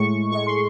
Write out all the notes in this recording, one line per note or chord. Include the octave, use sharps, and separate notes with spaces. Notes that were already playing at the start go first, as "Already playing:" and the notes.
Already playing: A2 G#3 C#6
A2 G#3 C#6
C6